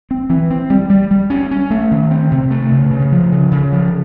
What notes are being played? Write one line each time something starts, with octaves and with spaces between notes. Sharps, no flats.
C4
E3
C4
G3
G3
G3
C#4
C#4
A3
D#3
C4
C3
A3
C#3
C#3
F3
C#3
C#3
F3